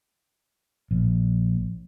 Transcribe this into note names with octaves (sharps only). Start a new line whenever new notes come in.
A#1